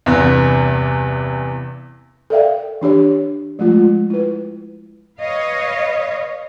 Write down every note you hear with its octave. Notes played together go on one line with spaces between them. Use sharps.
E2 G2 C3 B3
A4 A#4 D5 E5 F5 G5
E3 D4 G4 C#5
F3 G#3 A3 F4
E4 B4
B4 C#5 D#5 F5